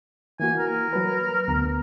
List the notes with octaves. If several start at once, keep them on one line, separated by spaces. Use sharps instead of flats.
E3 A#3 F#4 G#5
A#4
F#3 B4
D2 B3 A#5